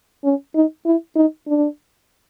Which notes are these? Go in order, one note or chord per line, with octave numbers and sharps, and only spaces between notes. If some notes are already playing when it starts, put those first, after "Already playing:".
C#4
D#4
E4
D#4
D4